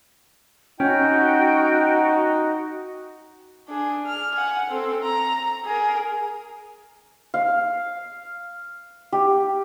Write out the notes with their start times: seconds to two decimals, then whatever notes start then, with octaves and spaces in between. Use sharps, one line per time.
0.80 C#4 D#4 F#4 G5
3.69 D4 G#4
4.06 F6
4.35 F#5 G#5
4.70 C4 A4
5.03 A#5
5.65 G#4 A#4
7.34 F5
9.12 G4